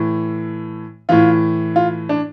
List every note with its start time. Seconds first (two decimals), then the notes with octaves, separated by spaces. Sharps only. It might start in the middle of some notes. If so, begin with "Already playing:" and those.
Already playing: A2 E3
1.09 A2 E3 F4
1.76 F4
2.09 D4